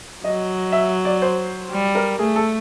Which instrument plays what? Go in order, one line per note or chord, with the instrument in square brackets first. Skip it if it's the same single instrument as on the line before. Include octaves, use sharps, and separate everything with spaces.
[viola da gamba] F#3 [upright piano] D#5
[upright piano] E5
D5
C5
[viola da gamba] G3
[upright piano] A#4
[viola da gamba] A3 [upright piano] G#4
[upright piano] A4